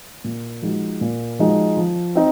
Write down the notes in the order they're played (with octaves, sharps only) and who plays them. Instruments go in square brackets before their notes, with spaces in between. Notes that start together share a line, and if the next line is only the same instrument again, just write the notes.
[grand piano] A#2
F3 G#3 D#4 F#4
A#2
F3 G#3 D#4 F#4
F3
C4 D#4